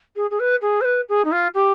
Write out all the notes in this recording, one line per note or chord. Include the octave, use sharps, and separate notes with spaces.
G#4
G#4
B4
G#4
C5
B4
G#4
D#4
F4
G4